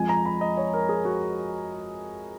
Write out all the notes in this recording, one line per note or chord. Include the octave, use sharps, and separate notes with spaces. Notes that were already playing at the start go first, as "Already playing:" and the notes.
Already playing: F2 F3 G#3 G#5
A#5
B5
D#5
C#5
A#4
G#4
F#4